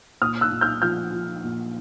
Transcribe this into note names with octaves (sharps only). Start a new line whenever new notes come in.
A#2 D#6 F6
E6 F#6
A#2
F6 G6
F3 F6 G6
F3
A#2